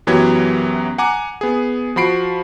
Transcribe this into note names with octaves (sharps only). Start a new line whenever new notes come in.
F#2 E3 F#3 B3 G4 G#6
F#5 G#5 A#5 D6
B3 G#4
F3 F#4 B5 C7 D7